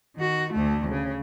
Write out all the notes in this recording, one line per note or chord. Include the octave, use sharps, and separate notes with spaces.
D#3 F#4
D2 A3
C#3